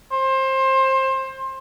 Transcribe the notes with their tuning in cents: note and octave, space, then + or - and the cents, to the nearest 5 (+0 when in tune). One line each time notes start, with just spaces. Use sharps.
C5 +25